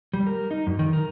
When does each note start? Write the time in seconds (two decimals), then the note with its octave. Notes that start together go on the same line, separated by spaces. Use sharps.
0.14 G3
0.27 A#4
0.51 D#4
0.67 F#2
0.79 D#3
0.93 A#4